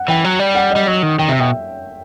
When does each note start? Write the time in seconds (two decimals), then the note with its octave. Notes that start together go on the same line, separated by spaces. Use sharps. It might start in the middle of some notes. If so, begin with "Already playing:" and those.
Already playing: F#5
0.08 E3 G5
0.25 F#3
0.39 G3
0.55 F#5
0.71 D#5
0.76 G3
0.86 F#3 D#5
1.03 D#3
1.18 D#3 G5
1.28 C3 E5
1.39 B2 G5